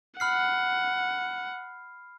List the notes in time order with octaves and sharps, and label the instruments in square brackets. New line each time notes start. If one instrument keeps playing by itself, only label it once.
[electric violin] F#5 [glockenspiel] B5 F6 C7